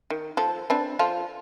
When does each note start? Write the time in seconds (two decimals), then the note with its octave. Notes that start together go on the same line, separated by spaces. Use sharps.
0.10 D#3
0.37 F3 A4
0.70 C4 D4 B4
0.99 F3 F4 A4